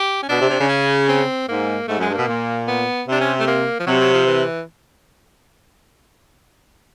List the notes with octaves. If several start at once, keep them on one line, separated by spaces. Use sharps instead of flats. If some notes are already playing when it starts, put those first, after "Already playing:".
Already playing: G4
C#4
B2 D4
C3
C3
C#3
C#4
C4
G#2 A#3
G#2 A3
F#2
G#3
G2
B2 A#3
A#2
B3
C3 D4
C#4
A3
A#3
F3
C3 F#3
F#3
F3
E3